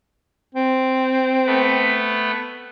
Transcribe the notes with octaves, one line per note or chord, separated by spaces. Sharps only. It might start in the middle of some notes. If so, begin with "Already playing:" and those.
C4
A3 B3 B4